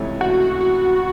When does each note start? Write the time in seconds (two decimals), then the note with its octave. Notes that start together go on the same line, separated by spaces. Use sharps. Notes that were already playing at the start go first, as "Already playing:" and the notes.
Already playing: C#2 C3 E3 A3 C#4
0.21 F#4
0.40 F#4
0.61 F#4